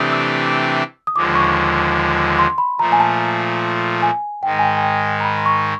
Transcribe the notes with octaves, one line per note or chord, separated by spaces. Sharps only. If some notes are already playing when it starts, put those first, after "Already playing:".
Already playing: C3 E3 A3 D4 G4 D6 D#6
E6
D#6
D#2 D3 F3 G#3 D6
C#6
C6
B5
A#2 F3 A3 A#5
G#5
A5
G#5
G#2 D#3 G#3 G5
G#5
G5
G#5
G5
A#5
B5
C6
C#6